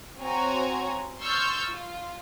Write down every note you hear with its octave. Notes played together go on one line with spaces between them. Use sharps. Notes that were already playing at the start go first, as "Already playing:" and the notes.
C4 F#4 C#5 G#5 A#5
C6 C#6 E6 F6 G6 A6
F4